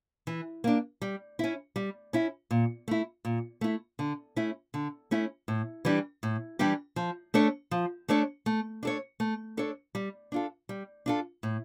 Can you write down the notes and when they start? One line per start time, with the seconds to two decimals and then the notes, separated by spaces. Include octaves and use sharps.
0.27 E3
0.64 A#3 D4
1.01 G3
1.39 C#4 E4
1.76 G3
2.13 C#4 E4
2.51 A#2
2.88 A3 E4
3.25 A#2
3.61 A3 E4
3.99 D3
4.36 A3 C#4 E4
4.74 D3
5.11 A3 C#4 E4
5.48 A2
5.85 E3 G3 D4 G4
6.23 A2
6.59 E3 G3 D4 G4
6.96 F3
7.34 A3 D4 A4 C#5
7.71 F3
8.08 A3 D4 A4 C#5
8.46 A3
8.83 D4 A4 C#5
9.20 A3
9.57 D4 A4 C#5
9.95 G3
10.32 D4 F4 A4
10.69 G3
11.06 D4 F4 A4
11.43 A2